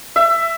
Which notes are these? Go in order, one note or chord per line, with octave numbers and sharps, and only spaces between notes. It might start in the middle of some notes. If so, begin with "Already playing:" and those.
E5